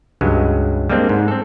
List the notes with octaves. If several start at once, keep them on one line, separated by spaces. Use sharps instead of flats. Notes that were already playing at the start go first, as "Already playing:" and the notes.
C#2 G2 F#3 G#3
G3 G#3 A#3 C4 D4
G#2
C4 A4